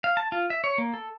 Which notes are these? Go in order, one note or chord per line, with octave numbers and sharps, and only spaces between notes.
F5
A5
F4
E5
C#5
A#3
A4